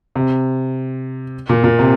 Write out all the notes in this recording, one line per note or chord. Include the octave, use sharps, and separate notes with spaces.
C3
A#2
A#2
C3